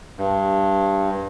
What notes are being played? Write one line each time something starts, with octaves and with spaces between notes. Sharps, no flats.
G2